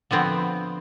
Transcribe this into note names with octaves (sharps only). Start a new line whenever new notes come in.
D3 F3 B3 C4